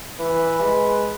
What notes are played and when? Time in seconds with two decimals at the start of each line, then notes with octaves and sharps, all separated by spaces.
0.19 E3 B4
0.62 G#3